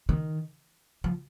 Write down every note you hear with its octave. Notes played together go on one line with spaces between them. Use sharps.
D#3
F3